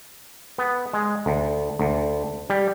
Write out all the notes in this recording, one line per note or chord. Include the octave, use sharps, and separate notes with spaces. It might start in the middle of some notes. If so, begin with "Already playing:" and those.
B3
G#3
D2
D2
G3